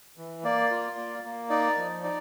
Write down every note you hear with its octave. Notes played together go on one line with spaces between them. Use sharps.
E3
A#3 D5
F4
A#3
A#3
D#4 D5
F3
D#4 D5